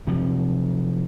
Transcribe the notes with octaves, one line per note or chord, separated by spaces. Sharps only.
C3 F3 F#3